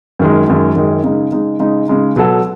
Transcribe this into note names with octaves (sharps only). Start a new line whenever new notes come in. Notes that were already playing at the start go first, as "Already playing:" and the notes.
F#2 D#3 G#3
F#2 D#3 G#3
F#2 D#3 G#3
C#3 G#3 D#4
C#3 G#3 D#4
C#3 G#3 D#4
C#3 G#3 D#4
B2 F#3 B3 F#4 A4